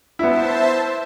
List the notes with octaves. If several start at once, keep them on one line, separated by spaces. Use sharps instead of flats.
B3 E4 C5 E5 A5